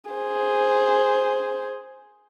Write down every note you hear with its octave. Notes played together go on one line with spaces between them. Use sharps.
G#4 C5